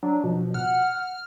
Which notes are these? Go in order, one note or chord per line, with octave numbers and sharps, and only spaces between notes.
F#3 D4
B2 F3
F#5 F6